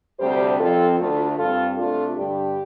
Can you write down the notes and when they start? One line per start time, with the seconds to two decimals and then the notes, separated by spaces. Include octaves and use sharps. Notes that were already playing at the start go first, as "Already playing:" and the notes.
0.19 D2 C3 G3 D4 G4 C5
0.59 F2 F3 C4 F4 A4
0.98 D2 D3 A3 D4 F4 A4
1.38 G2 G3 C4 F4 A4
1.77 C3 A3 D4 F4 A4
2.17 G2 D3 G3 D4 G4